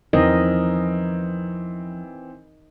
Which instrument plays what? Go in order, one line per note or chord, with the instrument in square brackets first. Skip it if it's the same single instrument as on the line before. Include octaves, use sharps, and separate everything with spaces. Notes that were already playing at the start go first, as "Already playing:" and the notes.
[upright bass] E2 F3 [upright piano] E3 C4 [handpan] D#4 A#4 D#5